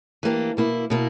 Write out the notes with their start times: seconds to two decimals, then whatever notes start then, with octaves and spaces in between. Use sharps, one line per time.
0.23 E3 A#3 D4 G4
0.57 B2 A#3 E4
0.90 B2 A#3 E4